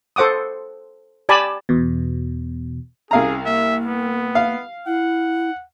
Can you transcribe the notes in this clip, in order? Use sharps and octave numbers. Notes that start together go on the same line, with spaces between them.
A4 C5 F#5 D6 D#6
G4 D5 G#5 A5 B5
E2 B2
C2 C#4 G#4 F5 A#5
A#3 E5
B3
F5
E4 F#5